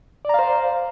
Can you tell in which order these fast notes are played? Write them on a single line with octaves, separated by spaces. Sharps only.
D5 A#5 F5 C5